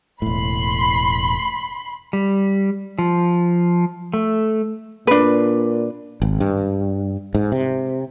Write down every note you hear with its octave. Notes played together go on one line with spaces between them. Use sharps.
E1 A2 B5 C6
G3
F3
A3
A#2 D4 B4
G#1
G2
G#2
C3